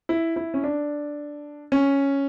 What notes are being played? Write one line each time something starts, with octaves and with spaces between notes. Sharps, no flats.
E4
E4
C#4
D4
C#4